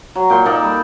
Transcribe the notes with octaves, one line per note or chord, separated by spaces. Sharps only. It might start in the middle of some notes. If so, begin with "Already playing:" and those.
F#3
A#2 G5 C6
A#3 D#4 A4 D5
G3